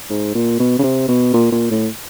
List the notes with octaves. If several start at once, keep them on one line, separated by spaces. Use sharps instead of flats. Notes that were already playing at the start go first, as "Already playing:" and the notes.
G#2
A#2
B2
C#3
C3
B2
A#2
A#2
A2